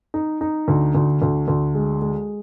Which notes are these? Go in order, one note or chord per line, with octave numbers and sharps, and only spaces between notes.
D#4
D#4
D2
D2
D2
D2
G#3
G#3